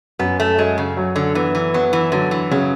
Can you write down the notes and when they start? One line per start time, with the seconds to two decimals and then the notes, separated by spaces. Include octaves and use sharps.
0.19 F#2 B3
0.40 A3
0.58 F#3 G#3
0.78 C#3
0.97 F#3
1.16 D3
1.35 E3 B3
1.55 E3
1.74 F#3 B3
1.93 E3
2.12 D3 F#3
2.31 E3
2.51 C#3 F#3